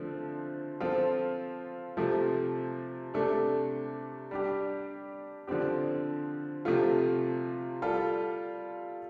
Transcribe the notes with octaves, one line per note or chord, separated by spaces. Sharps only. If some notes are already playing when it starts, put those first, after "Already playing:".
Already playing: D3 F3 A3 C4
F3 C4 F4 A4
C3 F3 A3
C3 A3 D4 A4
G3 D4 G4
D3 F3 C4 G4
C3 F3 A3 F4
G3 F4 A4